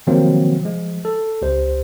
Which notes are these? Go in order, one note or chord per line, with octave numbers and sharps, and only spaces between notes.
C3 D#3 F3 F#3 A#3 C4
F3 G#3
A4
C#2 G4 C5